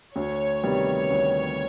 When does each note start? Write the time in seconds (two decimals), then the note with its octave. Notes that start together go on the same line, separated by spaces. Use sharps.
0.15 D2 C#5
0.63 C3 D#3 G3 B3
1.10 D2